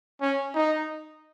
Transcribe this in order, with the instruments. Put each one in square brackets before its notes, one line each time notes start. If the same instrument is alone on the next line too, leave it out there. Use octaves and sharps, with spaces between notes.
[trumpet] C#4
D#4